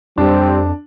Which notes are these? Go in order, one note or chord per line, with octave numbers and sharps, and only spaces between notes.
F2 G3 C4 D4